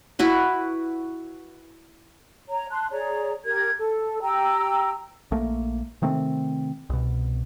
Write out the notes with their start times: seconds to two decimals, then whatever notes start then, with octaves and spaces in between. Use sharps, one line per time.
0.19 E4 F#4 B4
2.49 C#5 A#5
2.70 A5 C6 F#6
2.91 G#4 C#5 D5 A#5
3.44 G4 A#4 G#6
3.78 A4
4.22 G4 G5 A#5 E6
5.31 A#1 A3 A#3
6.02 C3 D#3 A3 C4
6.90 C2 B2